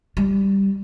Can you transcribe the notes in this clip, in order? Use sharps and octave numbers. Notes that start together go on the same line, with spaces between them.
G3